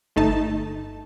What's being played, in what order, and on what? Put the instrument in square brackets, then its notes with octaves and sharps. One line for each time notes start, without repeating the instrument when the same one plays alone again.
[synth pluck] G1 A3 D#4 A5